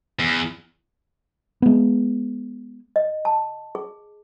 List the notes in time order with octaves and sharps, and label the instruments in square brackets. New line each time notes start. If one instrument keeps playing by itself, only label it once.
[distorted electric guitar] E2
[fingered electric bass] G#3 B3
[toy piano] D#5
A5
G#4